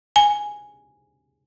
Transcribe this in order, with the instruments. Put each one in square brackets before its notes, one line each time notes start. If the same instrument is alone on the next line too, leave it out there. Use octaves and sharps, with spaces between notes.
[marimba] G#5